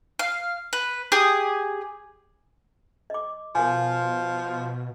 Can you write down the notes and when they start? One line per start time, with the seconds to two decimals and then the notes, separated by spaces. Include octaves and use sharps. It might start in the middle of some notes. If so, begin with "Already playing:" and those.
0.19 F5
0.73 B4
1.12 G4 G#4 G#5 D#6
3.10 D#5 D6
3.55 B2 F3 A#4 F5 G#5